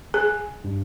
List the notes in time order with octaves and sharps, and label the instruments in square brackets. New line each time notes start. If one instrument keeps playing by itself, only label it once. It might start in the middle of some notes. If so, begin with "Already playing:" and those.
[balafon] G#4 [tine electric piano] G#5
[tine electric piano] G2